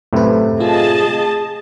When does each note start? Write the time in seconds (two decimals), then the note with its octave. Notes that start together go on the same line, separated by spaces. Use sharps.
0.13 F#2 A2 C3 A3 B4
0.60 F4 G#4 D#5 A5